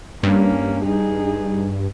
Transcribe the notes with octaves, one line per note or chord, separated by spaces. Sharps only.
G2 A#3 C#4
D#4 G#4